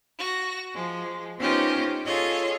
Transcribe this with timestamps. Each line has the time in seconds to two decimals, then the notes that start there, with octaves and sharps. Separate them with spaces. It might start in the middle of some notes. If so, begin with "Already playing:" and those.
0.18 F#4 A#6
0.74 F3 G#3
1.38 B3 C#4 D#4 F4 G4 C5
2.05 F4 G#4 A4 C#5 D#5